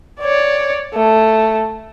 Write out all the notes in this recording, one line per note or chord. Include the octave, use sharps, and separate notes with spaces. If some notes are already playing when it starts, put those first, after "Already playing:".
C#5 D5
A3